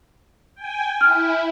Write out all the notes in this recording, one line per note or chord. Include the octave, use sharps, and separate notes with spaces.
G5 G#5
E4 F6